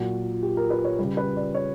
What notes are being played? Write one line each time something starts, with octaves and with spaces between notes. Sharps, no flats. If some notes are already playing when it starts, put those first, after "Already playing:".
Already playing: A#2 F#3 F#4
G4
A#4
B4
C#5
C#3 G3 B4
B4
D5
C#5